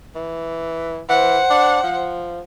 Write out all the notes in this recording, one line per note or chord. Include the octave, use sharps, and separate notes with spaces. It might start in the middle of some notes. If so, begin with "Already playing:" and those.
E3
E3 C5 F#5
D4
F3